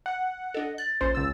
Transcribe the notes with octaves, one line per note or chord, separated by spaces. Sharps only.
F#5
D4 A4 D#5
F#6 A6
A#1 C#4 C5
C#2 E6 A6